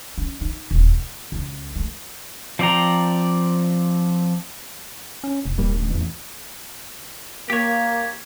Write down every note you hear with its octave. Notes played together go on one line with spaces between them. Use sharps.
C#4
D#4
D#1
B3
C#2
A3
F3 C4 D5 G5 A#5
C#4
F1
D#1 G2 G3 A#3
A1 D2
A1 E2
A#3 G4 C#5